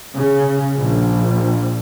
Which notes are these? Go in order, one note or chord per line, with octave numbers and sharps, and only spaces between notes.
C#3
A#1